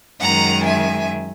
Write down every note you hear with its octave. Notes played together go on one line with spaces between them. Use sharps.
F#2 D#3 G#3 F#5 A#5
E5 G#5